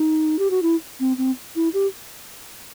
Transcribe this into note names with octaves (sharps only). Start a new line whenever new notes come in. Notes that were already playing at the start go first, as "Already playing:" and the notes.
Already playing: D#4
G4
F#4
E4
C4
C4
E4
G4